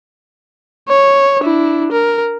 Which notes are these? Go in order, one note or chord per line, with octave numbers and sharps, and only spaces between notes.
C#5
D4 E4
A#4